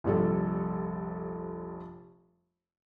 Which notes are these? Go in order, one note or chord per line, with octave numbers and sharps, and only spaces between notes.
F1 A#1 G3 A4